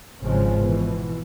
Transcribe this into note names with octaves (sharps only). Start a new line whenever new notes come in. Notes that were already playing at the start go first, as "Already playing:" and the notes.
G#1 C#3 F3 G#3
B2 E3